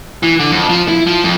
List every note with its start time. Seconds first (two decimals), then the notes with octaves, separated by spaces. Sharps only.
0.23 E3
0.39 D3
0.52 F2
0.69 F3
0.88 E4
1.07 F3
1.24 F2